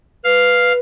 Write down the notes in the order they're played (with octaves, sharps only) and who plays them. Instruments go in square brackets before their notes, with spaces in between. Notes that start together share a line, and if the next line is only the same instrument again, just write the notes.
[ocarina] B4 [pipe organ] F5